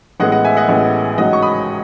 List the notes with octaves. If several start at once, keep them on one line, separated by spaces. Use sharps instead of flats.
A1 A2 G#3 B3 D#5 F#5
D#5 F#5
E5 G#5
D#5 F#5
A1 A2 G#3 B3
A1 G#2 F#3 D#5 F#5
C#6
B5 D#6